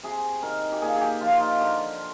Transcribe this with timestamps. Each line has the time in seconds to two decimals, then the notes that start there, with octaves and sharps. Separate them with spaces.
0.03 C3 G#4
0.43 D#3 A#4
0.72 G4
0.82 A#2 G#4
0.96 G4 G#4
1.21 F3 F4
1.31 F4
1.40 D#4
1.60 D3 G4